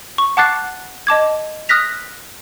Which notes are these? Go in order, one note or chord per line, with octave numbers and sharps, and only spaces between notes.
C#6
F#5 A5 D6 F#6 A6 C7
D#5 A5 D6 G#6
D#6 F6 F#6 A#6 B6 F7